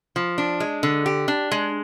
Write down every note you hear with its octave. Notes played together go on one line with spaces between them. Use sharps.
F3
D4
G#3
D3
G4
D4
G#3